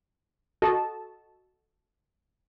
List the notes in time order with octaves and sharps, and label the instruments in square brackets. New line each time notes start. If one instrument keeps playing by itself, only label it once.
[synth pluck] F#4 A4 D#5 A5